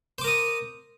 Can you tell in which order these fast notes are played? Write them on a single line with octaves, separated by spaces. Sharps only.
C5 D6 A#4 D#6